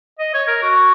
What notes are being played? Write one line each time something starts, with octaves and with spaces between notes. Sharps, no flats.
D#5
C#5
A#4
F#4